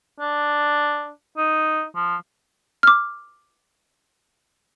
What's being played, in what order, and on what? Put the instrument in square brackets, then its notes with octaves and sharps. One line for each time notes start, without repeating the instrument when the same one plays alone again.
[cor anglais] D4
D#4
F3
[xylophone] D6 F6